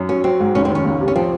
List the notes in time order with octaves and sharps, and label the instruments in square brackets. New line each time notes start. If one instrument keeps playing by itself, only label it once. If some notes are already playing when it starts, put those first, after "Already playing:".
Already playing: [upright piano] F#2
[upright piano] F#3 [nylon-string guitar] C#4
[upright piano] F#3 [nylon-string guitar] C4
[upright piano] G#2
[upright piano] F1 [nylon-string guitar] C#4
[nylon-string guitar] C4
[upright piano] D#3 [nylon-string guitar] C#4
[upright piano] C#2
C3
[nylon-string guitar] C#4
[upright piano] F3 [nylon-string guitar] C4